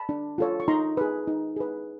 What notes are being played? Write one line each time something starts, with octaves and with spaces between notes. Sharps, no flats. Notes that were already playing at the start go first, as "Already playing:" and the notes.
Already playing: A5 B5
D4
F4 A4 C#5
C#6
D#4 A#5 C6
G#4 B4
D#4
G#4 B4